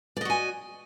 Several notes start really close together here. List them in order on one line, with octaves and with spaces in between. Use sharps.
D5 D#5 F#4 G#5